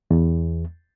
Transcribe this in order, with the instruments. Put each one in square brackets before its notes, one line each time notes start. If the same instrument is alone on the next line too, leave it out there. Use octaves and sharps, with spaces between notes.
[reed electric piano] E2